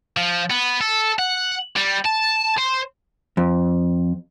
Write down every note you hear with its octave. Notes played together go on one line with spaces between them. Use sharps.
F3
B3
A4
F#5
G3
A5
C5
F2